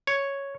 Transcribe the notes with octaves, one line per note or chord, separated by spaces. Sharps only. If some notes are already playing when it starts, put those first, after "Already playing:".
C#5